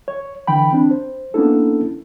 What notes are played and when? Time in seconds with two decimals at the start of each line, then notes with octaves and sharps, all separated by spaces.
0.08 C#5
0.47 D3 E3 G5 B5
0.73 C4 D4
0.91 C5
1.34 A#3 B3 C#4 D4 E4 A4